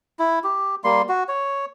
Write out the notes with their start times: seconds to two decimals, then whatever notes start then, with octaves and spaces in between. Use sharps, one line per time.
0.19 E4
0.44 G4
0.84 G3 A#3 C6
1.09 F#4
1.28 C#5